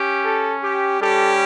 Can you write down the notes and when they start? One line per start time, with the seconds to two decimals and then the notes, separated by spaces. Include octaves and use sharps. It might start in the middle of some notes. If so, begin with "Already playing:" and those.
Already playing: C#4 G4
0.25 A4
0.62 G4
1.00 G3 C#4 G4 A4